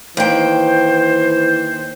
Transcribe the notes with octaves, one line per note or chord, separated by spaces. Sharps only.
D#2 E3 C5 G5